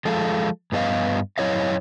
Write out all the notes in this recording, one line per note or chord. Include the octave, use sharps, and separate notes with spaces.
F3 G#3 F4 A4
G2 B3 F#4 D#5 F5
F#2 C4 E4 C#5 D#5 F5